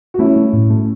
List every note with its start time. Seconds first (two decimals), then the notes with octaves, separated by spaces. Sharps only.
0.14 F#4
0.19 A3 C#4 E4
0.36 A3
0.53 A2
0.70 A3